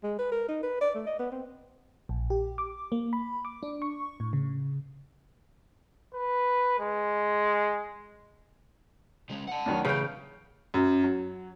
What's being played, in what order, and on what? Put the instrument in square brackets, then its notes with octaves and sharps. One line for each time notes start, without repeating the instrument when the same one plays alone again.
[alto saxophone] G#3
B4
A#4
D#4
B4
D5
A3
D#5
B3
C4
[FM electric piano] A#1
G4
D6
A#3
B5
D6
D4
C#6
A2
C#3
[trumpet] B4
G#3
[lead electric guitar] C#3 G#3
F#5 A5
[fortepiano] D2 D#3 F#3
[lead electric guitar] E2 A2 [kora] C#3 G5 [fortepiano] B4
[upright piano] F#2
F#3